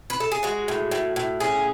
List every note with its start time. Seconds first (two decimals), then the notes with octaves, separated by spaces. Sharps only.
0.10 B4
0.20 A4
0.32 G#4
0.43 G#3 F#4
0.68 A2
0.91 A2
1.16 A2
1.40 C#4 G#4